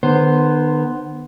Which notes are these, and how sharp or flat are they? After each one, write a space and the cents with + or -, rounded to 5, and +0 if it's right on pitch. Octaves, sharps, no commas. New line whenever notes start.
D#3 -45 B3 +0 C5 +0